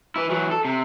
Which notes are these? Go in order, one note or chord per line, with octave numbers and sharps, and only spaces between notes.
E3 E4
E3 F#3
A4
C3